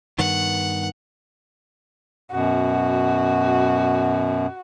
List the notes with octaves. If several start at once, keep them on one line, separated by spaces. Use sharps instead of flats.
G2 D#3 B3 F#5
F#2 B2 F#4